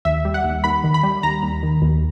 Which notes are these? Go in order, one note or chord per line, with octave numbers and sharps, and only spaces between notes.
D#2 E5
G3
F#5
D#2
D#2 B5
D#3
B5
G3
D#2 A#5
D#2
D#3
D#2